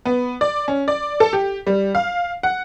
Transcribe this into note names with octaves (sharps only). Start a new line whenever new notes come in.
B3
D5
C#4
D5
A4
G4
G3
F5
F#5